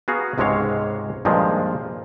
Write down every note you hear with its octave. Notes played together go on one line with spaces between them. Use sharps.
B3 F#4 G#4 F5 A#5
C#2 G#2 C3 G#3 C#5 F5
G2 A#2 D#3 F3 G#3